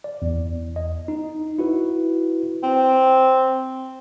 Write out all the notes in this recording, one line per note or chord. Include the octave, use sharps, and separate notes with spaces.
D5
E2
D#5
D#4
E4 F#4 B4
C4